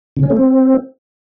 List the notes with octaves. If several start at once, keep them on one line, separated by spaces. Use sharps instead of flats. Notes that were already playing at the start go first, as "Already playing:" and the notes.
C#3
C#4
A3
C4